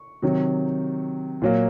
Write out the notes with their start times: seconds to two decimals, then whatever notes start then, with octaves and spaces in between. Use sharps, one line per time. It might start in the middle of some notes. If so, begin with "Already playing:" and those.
Already playing: C#6
0.22 C3 D#3 F#3
1.42 A#2 F#3 A#3